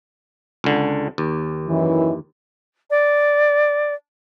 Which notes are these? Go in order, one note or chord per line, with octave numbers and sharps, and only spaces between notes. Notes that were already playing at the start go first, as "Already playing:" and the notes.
C#2 D3
D#2
F#2 D#3 E3
D5